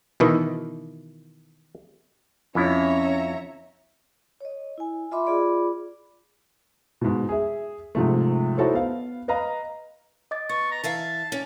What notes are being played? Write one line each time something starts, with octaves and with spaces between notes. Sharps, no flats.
B2 D#3 E3
F2 C#4 E4 C#5 E5 A#5
C#5 D#5
E4 G#5
F4 D#5 E5 B5 C6 D6
F4 G#4 D5 B5 D6
G#2 B2
G#4 E5
G#2 C3 F3 A3
D#4 E4 F#4 A4 C5 C#5
B3 F5
B4 D#5 F5 A#5
D#5 D6 A6
B3 C#6 A6
A#5
E3 E5 F5 A5
C#4 D5